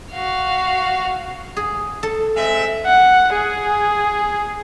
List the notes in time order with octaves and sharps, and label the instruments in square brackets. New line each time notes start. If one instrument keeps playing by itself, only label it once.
[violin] F#4 F5
[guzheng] G#4
A4
[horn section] G#3 C4 E5
[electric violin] F#5
G#4